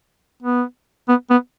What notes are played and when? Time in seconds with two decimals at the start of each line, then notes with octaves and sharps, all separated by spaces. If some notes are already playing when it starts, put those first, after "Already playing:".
0.43 B3
1.08 B3
1.30 B3